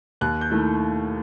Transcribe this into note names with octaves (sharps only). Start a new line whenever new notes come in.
D#2 F#6
G6
D#3 A3 E4